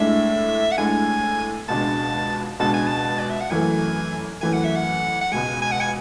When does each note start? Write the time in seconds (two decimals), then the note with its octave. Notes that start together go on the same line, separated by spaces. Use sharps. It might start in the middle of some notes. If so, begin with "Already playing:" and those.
Already playing: A2 G#3 D4 E5
0.72 F#5
0.78 A2 G#3 D4 G#5
1.68 C#2 B2 G#3 D4 A5
2.59 C#2 B2 G#3 D4 A5
2.74 G#5
2.87 A5
3.19 D5
3.30 E5
3.41 F#5
3.50 F#2 E3 A3 G#5
4.41 F#2 E3 A3 G#5
4.53 F#5
4.64 E5
4.75 F#5
5.21 F#5
5.32 C#2 B2 G#3 G#5
5.62 G#5
5.71 F#5
5.80 G#5